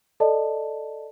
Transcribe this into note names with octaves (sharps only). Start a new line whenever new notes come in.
A4 D5 D#5 A5